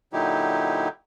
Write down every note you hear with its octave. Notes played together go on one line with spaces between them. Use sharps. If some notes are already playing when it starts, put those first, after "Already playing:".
A#2 D3 F#3 D#4 E4 G4